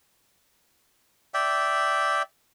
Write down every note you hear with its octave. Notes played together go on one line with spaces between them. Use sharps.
D5 E5 G5